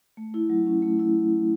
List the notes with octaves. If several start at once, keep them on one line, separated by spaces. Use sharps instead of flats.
A3
E4
F#3
C#4
A3
E4